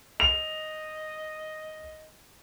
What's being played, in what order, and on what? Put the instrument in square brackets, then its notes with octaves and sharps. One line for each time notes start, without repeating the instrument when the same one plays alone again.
[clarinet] D#5 [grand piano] F7